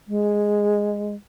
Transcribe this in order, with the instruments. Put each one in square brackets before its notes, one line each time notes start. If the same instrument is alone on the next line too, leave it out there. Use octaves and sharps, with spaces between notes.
[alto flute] G#3